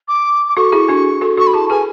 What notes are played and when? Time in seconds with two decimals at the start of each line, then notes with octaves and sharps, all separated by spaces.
0.08 D6
0.48 D6
0.57 F#4 A4 C#6
0.72 E4 G#4
0.89 D4 F#4
1.21 F#4 A4
1.37 F#4 A4 C#6
1.47 B5
1.53 E4 G#4 A5
1.70 G#4 B4 G#5